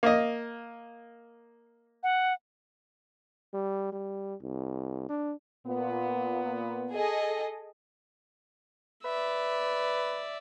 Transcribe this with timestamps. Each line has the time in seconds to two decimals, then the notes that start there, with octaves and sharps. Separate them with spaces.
0.03 A#3 D#5
2.03 F#5
3.54 G3
3.92 G3
4.41 C2
5.09 D4
5.66 A#2 B3
6.91 G#4 A4 D#5
9.04 B4 D5 E5